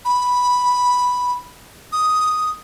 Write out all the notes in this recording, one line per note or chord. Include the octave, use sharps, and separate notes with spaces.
B5
D#6